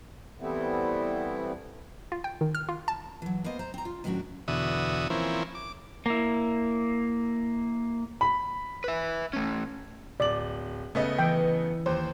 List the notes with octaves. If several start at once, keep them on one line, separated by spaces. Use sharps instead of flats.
E3 G3 A3 B3 C4 E4
F4
G5
D#3
F6
F4
A5
E3 F#3
A#3 B3 C5 D#5
C5 A#5
C4 A#5
F4
D#2 A2 F#3 C#4 D4 F#4
E2 B2 D3 F#4 E5 D#6
E3 F3 A#3 C4 C#4 E4
D6
A#3 E4
B5
B4 E5
A3 C#4
D1 D5 F#7
C#3 A3 B3 D#5
E3 G5
D#2 C5